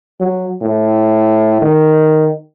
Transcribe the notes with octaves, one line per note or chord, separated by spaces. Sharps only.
F#3
A2
D#3